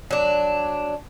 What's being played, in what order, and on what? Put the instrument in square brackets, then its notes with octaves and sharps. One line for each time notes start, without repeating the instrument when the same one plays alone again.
[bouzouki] F#3 D4